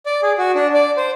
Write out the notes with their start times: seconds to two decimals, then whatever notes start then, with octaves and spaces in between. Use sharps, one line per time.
0.06 D5
0.22 G#4
0.38 F#4
0.55 D4
0.74 D5
0.97 C5